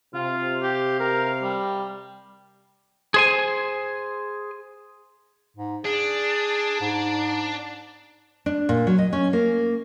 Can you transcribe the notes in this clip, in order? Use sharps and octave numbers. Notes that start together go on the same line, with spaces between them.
C3 F4 F5
G4
A#4
G3
G#4 C5 G#5
G#2
D4 G#4
G#2
D4
A#2
F#3
D#5
C#4
A#3